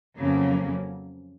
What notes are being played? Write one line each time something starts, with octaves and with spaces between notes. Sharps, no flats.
F2 C#3 F#3 A#3